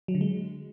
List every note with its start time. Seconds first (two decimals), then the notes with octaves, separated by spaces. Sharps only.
0.08 F#3
0.15 D3
0.21 G#3